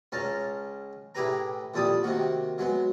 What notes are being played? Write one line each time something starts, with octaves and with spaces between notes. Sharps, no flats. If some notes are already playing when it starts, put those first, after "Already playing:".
C#2 C#4 F5 A5 A#5
A2 E4 G4 G#4 B4 A#5
A#1 F2 G3 E4 A5 D#6
C3 D#3 A#3 F#4
F#3 G#3 B3